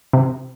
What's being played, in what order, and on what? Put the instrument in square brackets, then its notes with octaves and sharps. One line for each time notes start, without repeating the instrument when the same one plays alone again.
[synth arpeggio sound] C3